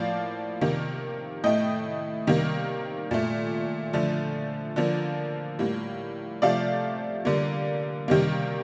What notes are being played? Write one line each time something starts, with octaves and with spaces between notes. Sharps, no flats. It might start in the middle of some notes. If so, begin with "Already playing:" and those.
Already playing: A2 F3 A#3 D5 F5
C3 D#3 A#3
A2 A3 D#5 G5
C3 D#3 G3 A#3
A#2 A3
D3 F3 A3
D3 F3 A#3
A2 G3 A#3
C3 F3 A3 D5 F5
D3 G3 A#3
C3 D#3 G3 A#3